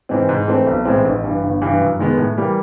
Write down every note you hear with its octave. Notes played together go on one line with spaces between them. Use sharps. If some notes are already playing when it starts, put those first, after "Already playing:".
G#2 E3 G#3 C4
G#2
E3 A3 C4
B1
A2 E3 G#3 C4
A1
G2 E3
G1
G2 E3
F#2
D#3 G#3 B3
A2
E3 G3 A#3